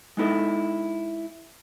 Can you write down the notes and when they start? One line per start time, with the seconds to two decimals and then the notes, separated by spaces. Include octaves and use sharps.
0.17 G#3 B3 D#4 E4 A4 D#5